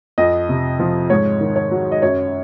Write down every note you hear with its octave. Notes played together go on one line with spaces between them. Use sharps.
F2 D#5
C3
F3
G#2 C#5
D#3
C#5
F#3
D#5
F#2 C#5